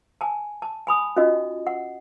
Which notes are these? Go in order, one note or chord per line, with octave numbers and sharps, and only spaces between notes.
G#5 A5
A5
G#5 B5 D#6
C#4 D#4 F4 F#4 D#5
F#5